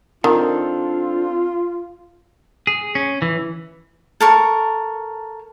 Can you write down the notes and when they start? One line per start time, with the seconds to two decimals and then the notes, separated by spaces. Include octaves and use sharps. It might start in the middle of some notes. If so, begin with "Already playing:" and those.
0.24 D#3 C4 D4 F4 A4
2.67 G#4
2.95 C#4
3.22 E3
4.20 A4 A#4 C#6